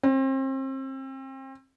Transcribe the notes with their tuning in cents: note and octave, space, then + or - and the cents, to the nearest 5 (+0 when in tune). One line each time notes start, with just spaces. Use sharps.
C4 +35